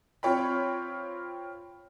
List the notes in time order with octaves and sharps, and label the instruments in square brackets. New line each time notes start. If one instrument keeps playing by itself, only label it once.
[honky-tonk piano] C4 F4 C#5 G5 B5